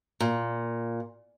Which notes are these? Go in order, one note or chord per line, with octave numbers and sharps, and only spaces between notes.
A#2